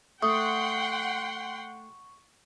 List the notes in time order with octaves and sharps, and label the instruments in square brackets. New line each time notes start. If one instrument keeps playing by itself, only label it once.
[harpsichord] A3 [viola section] F#5 G5 C6 [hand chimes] C#6 [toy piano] D#6